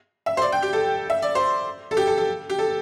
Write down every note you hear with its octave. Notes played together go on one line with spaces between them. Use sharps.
E5
C5
D5
G5
G4
A4
E5
D5
C5
A4
G4
A4
A4
G4
A4